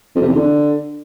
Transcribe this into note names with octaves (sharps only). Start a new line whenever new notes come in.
F2
C3
E2
D3